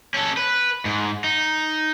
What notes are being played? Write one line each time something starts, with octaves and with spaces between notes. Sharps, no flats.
C#4 A4
B4
G#2
D#4